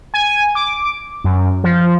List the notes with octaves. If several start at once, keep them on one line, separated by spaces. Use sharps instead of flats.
G#5
D6
F#2
F3